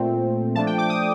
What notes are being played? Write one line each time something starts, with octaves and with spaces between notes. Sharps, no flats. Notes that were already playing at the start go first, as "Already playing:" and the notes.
Already playing: A#2 A3 C4
F3 A3 D4 A5
G5
D6
D#6